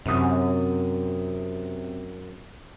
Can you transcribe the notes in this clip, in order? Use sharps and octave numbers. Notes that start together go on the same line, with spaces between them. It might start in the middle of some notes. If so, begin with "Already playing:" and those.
F#2 C3 D#6